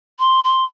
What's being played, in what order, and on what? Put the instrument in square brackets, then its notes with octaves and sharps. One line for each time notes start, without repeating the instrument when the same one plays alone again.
[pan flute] C6
C6